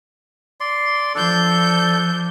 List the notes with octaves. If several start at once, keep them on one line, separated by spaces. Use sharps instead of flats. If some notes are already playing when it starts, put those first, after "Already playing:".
D5 C6
F3 D4 A4 G6